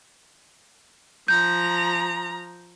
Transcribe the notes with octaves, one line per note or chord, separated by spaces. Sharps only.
F3 A#5 G6